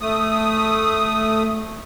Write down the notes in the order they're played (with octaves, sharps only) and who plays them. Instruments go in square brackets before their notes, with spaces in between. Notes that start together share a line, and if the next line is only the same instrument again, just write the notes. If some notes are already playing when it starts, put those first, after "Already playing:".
[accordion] A3 D#6